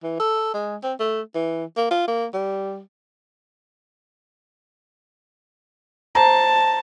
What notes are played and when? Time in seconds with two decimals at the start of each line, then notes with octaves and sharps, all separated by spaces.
0.03 E3
0.19 A4
0.54 G#3
0.83 C4
1.00 A3
1.35 E3
1.77 A#3
1.91 F4
2.08 A#3
2.33 G3
6.15 C5 A5 A#5